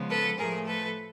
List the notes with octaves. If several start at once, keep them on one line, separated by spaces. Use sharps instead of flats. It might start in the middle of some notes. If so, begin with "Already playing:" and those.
Already playing: C#3 F3 G#3 B3
A4 B4
A2 F3 A3 G#4 A#4
A4 B4